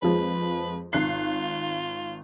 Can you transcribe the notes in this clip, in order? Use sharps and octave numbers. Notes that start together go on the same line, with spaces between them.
F2 F3 G#3 B4
G#1 F4 F#6 C7